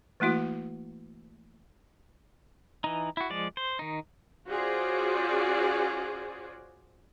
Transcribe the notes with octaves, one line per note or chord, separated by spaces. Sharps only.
E3 A3 A#3 E4 F#4
E3 D#4
E4 F#4
F3 G#3 D5
C5
D#3 D#4
C#4 F4 F#4 G#4 C5 D5